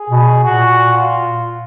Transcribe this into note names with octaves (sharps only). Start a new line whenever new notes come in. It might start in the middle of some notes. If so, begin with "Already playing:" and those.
Already playing: G#4
B2
A#2 F#4
F4